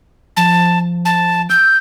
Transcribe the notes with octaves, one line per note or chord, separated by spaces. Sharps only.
F3 A5
A5
E6 G6